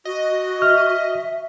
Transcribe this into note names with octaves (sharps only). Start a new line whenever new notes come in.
F#4 D#5
E5 F6